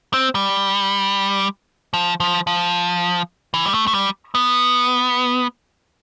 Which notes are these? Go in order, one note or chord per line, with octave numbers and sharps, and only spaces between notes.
C4
G3
F3
F3
F3
E3
G3
A3
A3
G3
B3